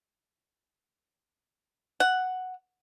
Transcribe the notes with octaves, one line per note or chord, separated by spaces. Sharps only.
F#5